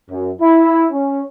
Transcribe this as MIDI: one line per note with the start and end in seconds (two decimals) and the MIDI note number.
0.10 0.31 42
0.41 0.87 64
0.92 1.22 61